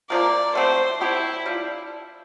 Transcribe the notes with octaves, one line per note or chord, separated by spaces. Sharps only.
C3 F3 A#3 D5
A3 C4 G4 C5
A3 C4 E4 G4
G3 D4 F4